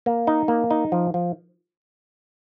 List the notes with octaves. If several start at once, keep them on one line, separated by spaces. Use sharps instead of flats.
A#3
D#4
A#3
D#4
F3
F3